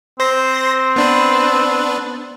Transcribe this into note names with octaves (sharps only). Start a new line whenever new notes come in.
C4 C5 C6 A#6
B3 D4 B4